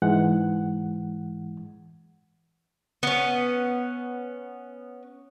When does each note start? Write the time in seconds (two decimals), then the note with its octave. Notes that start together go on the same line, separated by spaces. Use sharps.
0.02 G#2 E3 G#3 F#5
3.03 B3 C#4